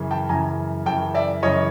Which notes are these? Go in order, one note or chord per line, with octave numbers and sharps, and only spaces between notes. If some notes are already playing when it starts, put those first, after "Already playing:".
Already playing: F#2 C#3 E3
G5 A5
F#2 C#3 E3 G#5 A#5
F#2 C#3 E3 G5 A5
D5 E5
F#2 C#3 E3 C#5 D#5